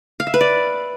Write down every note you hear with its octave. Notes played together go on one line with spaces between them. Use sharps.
F5
E5
B4
D5